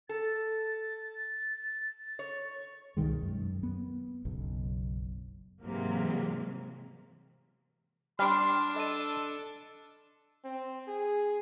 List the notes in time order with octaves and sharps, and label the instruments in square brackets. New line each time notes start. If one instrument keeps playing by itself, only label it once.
[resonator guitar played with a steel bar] A4 [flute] A6
[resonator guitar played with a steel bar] C#5
[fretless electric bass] C2 B2 D#3 G#3
F#2
B3
F#1 B1
[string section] G#2 C3 E3 F#3 G#3 A#3
[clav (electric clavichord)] G3 [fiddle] D4 [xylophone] B5 F6 [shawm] C6
[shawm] A4 [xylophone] D#5 D#7
[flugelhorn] C4
G#4